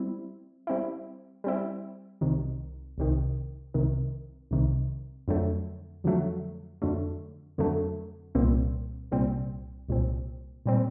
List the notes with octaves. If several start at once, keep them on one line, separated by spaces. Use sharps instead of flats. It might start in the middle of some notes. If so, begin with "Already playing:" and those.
Already playing: G3 C4 E4
G3 C4 E4
G3 C4 E4
C2 C3 D#3
C2 C3 D#3
C2 C3 D#3
C2 C3 D#3
F2 D3 F#3 A3
F2 D3 F#3 A3
F2 D3 F#3 A3
F2 D3 F#3 A3
C2 A#2 G3 C4
C2 A#2 G3 C4
C2 A#2 G3 C4
A#2 G3 C4